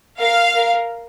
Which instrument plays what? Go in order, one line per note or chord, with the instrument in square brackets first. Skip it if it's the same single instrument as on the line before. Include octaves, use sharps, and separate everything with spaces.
[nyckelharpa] A#4 [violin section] F5
[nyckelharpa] A#4